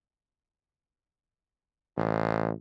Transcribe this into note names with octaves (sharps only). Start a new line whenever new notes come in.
A1